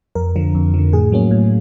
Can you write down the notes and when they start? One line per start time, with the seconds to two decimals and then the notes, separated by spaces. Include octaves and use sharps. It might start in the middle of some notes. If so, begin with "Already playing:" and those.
0.15 F2 A#4
0.36 D3 F3
0.55 F2
0.74 D3 F3
0.93 A2 G#4
1.12 F#3 A#3 C#4
1.31 A2